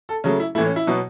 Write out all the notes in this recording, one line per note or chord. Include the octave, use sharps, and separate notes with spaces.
A4
C#3 F#3 A3 C#4
E4
A2 E3 A3 E4
C#4
E4
B2 F#3 B3